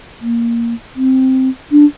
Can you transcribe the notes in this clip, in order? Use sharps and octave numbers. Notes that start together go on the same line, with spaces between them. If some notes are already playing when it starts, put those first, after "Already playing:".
A#3
C4
D4